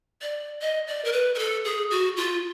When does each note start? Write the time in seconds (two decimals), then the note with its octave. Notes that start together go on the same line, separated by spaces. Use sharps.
0.22 D5
0.61 D#5
0.87 D5
1.05 A#4
1.12 B4
1.35 A#4
1.39 A4
1.65 G#4
1.91 F#4
2.17 F4